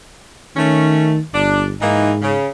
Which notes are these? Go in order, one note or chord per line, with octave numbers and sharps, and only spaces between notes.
D#3 A3 C#4
G1 D4
G#2 E3 A#3 D#4
C#3